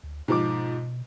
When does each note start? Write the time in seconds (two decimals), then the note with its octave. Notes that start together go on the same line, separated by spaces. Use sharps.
0.04 D2
0.28 G#2 B2 F3 D6